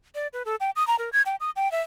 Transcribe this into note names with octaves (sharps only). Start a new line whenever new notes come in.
D5
B4
A4
G5
D#6
A#5
A#4
G#6
G5
D#6
G5
E5